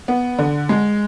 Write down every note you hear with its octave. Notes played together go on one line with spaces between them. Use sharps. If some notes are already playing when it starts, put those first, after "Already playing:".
B3
D3
G#3